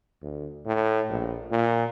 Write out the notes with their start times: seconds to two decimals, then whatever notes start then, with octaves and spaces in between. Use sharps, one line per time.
0.22 D2
0.66 A2
1.10 A#1
1.51 A#2